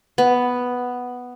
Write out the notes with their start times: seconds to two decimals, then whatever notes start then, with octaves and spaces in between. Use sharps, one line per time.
0.18 B3